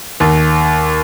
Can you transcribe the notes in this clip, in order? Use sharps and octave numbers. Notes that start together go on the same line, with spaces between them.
D#2